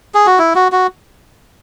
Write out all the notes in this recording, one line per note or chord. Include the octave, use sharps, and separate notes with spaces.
G#4
F#4
E4
F#4
F#4